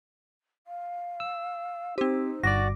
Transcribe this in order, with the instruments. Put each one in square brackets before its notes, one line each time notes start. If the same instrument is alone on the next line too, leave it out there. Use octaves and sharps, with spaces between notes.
[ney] F5
[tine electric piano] E6
[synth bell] C4 G4 [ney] D#4 [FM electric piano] C5
[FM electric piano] G1 G2 D6 [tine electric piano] F#4 D5 [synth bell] A#6